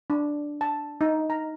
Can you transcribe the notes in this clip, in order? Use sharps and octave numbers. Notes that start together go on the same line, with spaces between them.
D4
A5
D#4
A#5